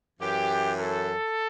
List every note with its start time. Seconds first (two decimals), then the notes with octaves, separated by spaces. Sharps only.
0.20 F#2 E3 G4
0.79 A4